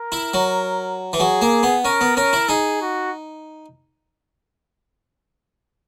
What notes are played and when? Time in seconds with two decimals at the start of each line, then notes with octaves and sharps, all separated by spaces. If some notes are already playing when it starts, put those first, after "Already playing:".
Already playing: A#4
0.12 E4
0.34 F#3
1.13 E3
1.19 F#3 G#4
1.41 A#3
1.63 B3
1.84 C#4 A#4
2.01 B3
2.16 C#4 A#4
2.33 E4
2.49 D#4 G#4
2.81 F#4